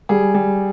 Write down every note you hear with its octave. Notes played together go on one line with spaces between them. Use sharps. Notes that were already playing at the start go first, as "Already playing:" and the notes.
G3 G#4
G3